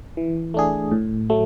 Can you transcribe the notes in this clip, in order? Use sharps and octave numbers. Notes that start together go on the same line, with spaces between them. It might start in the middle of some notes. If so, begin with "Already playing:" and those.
E3
A3 D4 G#4
A2
F#3 A3